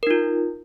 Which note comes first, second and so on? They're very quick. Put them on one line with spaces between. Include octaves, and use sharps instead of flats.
A#4 D#4 F4